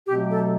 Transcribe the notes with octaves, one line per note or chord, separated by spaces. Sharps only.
B2 F#3 A3 C4 G4
A4